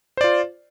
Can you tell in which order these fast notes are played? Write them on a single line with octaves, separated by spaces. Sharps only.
C5 D5 F4